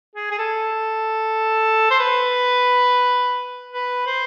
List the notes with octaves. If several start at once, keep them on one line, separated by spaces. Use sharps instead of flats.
G#4
G#4
A4
C5
B4
B4
C5